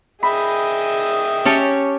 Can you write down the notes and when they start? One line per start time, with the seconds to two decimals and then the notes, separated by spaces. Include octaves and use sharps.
0.23 G#4 D#5 E5 G5 B5
1.45 C#4 G4 C#5 A5 C#6